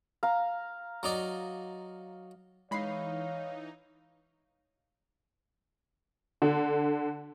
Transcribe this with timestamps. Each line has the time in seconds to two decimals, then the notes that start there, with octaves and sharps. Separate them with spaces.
0.23 F5 A#5
1.03 F#3 D#4 D5
2.71 E3 G#3 D#4 C#5 F5 B5 C7
6.42 D3